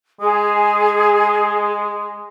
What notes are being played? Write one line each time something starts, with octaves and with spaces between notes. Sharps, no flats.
G#3 G#4